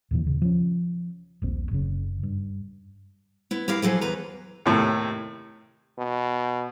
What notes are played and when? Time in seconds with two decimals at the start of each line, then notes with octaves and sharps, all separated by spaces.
0.11 D#2 A#2 E3
0.25 D#2 C#3
0.42 F3 C#4
1.42 D#1 A#1 C4
1.71 F#1 C#3
2.23 G2
3.51 B3 E4
3.68 E4 G4 A#4 F5 A#5
3.82 F3 F#3 G#4 A4
4.01 E2 B4 A#5
4.66 D#2 A2 C3 A3
5.99 B2